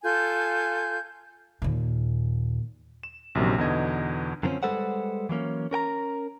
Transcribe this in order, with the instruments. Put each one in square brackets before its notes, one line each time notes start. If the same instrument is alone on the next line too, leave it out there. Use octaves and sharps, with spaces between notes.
[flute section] F4 A4 G#5 G6
[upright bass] D#2 A#2
[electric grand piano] E7
A#1 F#2 C3 D#3 F#3
E2 B2 D3 D#4 D#5 G#6
[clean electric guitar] F#2 D3 F3 A#3 C4 C#4
G3 G#3 A4 B4 C5 F#5
E3 F#3 A#3 C#4
C#4 A#4 G5 A#5